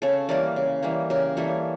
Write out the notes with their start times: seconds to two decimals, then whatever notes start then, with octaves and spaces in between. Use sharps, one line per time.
0.02 C#3 A4 C#5
0.29 E3 G3 A#3 A#4 D5
0.56 C#3
0.82 E3 G3 A#3
1.10 C#3 G4 A#4
1.37 E3 G3 A#3 A4 C#5